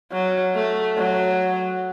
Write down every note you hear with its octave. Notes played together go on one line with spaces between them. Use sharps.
F#3
A3
F#3